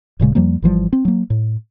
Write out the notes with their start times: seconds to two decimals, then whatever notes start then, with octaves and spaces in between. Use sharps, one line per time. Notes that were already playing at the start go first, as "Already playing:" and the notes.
0.19 D1 A#2 C#3 G#3
0.35 F2 F3 G3 A#3
0.62 G#1 E3 F3 G3
0.93 C4
1.05 F#3 A#3
1.30 A2